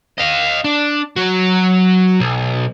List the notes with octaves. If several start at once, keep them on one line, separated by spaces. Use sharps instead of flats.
D#5 F5
D4
F#3 F#4
B1